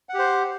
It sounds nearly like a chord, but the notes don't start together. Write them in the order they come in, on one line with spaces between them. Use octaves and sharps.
F#5 G4 C5